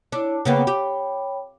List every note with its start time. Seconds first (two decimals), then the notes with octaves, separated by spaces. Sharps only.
0.12 D4 E4 C#5
0.45 C#3 A#3 B3 C#5 G5 B5
0.67 G4